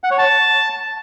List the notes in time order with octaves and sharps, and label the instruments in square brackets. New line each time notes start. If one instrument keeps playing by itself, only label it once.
[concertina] F#5
C#5
A5